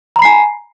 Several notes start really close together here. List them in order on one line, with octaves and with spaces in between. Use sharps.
A#5 B5 C7 G#5